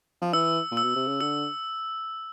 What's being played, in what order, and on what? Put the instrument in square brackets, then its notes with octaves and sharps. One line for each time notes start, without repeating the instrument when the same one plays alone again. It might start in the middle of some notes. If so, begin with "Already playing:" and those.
[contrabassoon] F3
[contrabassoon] E3 [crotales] E6
[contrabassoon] A#2
[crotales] E6
[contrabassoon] B2
C3
C#3
[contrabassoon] D3 [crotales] E6